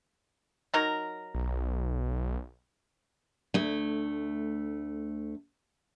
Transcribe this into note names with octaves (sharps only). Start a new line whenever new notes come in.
F#3 D#4 A#4
B1
D2 A3